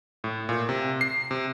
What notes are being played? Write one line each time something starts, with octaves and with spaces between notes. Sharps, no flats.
A2
A#2
C3
C7
C3